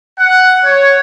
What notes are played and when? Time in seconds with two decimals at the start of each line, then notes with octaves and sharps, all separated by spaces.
0.20 F#5
0.65 C#5